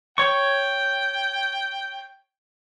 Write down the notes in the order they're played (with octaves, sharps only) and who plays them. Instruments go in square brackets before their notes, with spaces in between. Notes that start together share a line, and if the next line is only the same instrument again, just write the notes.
[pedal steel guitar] C#5 C#6 [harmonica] G5